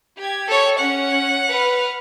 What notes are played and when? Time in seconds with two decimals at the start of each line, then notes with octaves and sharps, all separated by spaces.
0.16 G4 G#6
0.48 A4 C#5
0.78 C#4 F#5
1.49 B4 F6